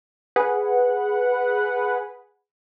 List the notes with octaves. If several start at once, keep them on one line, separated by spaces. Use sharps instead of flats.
G#4 B4 F#5